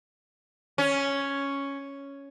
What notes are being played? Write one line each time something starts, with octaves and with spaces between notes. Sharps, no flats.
C#4